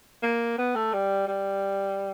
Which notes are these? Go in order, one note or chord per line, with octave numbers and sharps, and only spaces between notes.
A#3
B3
A3
G3
G3